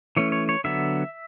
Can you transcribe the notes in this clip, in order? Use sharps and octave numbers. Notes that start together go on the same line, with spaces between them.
E3 A3 C#4 C#5
C#5
C#5
D3 F#3 B3 E5